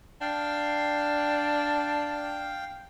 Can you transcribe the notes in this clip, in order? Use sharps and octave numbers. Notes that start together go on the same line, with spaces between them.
D4 F5 G5